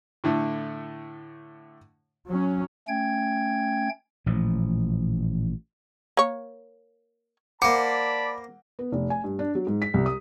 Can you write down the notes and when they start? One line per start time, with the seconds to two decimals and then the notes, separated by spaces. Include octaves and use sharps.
0.24 A2 D3 A3
2.28 F#3 C#4
2.88 A3 C#4 G5 G#6
4.26 A1 A#2 F3
6.17 A#3 C#5
7.62 A#3 C5 D5 F#5 A5 B5 D6
8.79 B3
8.92 F1
9.10 G#5
9.24 G2
9.39 D4
9.55 F#3
9.67 G#2
9.82 B6
9.94 C2
10.06 D#6